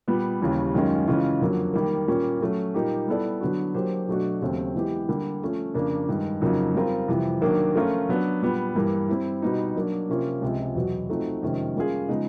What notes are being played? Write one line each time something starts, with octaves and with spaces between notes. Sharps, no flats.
A#2 G3 B3
D#2 C#3 E3 G3
F#2 D#3 G#3 C#4 F4
C#3 E3 G#3 C#4 F4
F2 D3 F#3 A#3
D#3 G3 A#3
A#2 G3 A#3 C#4
F#3 A3 C#4
A#2 G3 A#3 D#4 G4
G3 B3 E4 A4 D5
D3 F#3 B3 D4 F#4
F#3 A#3 D4 G4 C5
B2 F#3 A3 D4 F#4
D#2 C#3 F#3 A3 C4
E3 G#3 B3 E4 G4
D3 G3 A#3
F3 A3 C#4
F2 C#3 F3 A#3 D4
G2 D#3 G#3
F2 C#3 F#3 A#3 D#4
G3 C4 F4 A#4
F2 C3 E3 G3
D#3 F#3 A#3 D4
F3 A3 C#4 F4 A#4
F#3 B3 D4
A#2 G3 B3
G2 E3 G3 A#3
G3 C4 E4
B2 G3 B3 D#4
F#3 A#3 D4
C3 F3 A#3 C#4 F4
C#2 C3 F3 G#3 C4
E2 B2 F#3
F3 A3 C4 D#4 F#4
F2 C3 D#3 G#3 C#4
G3 A#3 C#4 F4 G#4
C#3 F3 G#3 B3 D#4